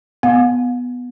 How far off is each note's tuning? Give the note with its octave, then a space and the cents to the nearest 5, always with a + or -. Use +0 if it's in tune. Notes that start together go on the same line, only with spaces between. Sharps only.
B3 +0 F5 +45